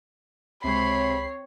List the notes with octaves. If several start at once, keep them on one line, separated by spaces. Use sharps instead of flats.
C#2 C3 G#3 C4 C#5 B5 C7